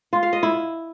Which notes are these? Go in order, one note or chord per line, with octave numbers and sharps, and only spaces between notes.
F4
F5
D#5
E4